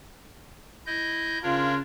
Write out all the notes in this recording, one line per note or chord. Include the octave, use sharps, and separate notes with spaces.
E4 D#5 G6
C#3 D4 F4 A#4 C#5